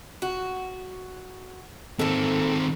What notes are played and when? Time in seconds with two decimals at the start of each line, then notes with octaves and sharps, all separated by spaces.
0.22 F#4
1.99 A#2 D#3 C4 A4